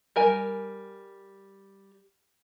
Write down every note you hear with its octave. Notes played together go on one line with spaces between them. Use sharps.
G3 A#4 G#5